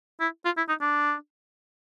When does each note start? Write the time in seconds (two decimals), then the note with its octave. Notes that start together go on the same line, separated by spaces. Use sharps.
0.20 E4
0.45 F4
0.57 E4
0.69 D#4
0.81 D4